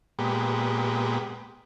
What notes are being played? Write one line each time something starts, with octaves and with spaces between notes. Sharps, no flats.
A#2 G#3 B3 G4